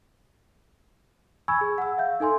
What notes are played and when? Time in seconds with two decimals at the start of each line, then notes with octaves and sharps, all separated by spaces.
1.48 G#5 B5 C#6 E6 G#6
1.61 G#4
1.78 F#5 E6
1.98 E5 F5 G6
2.20 D#4 A4 G#5 C6